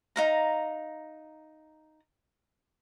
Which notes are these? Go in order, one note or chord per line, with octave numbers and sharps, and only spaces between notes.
D#4 F5 A#5